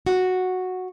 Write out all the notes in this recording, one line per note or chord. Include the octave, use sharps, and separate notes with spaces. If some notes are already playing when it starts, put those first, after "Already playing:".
F#4